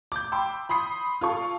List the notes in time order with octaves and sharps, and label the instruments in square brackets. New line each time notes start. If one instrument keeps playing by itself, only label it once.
[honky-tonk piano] D6 G6
G5 B5 C6 D6 E6
B5 C6 D#6 C7
F4 A4 C#6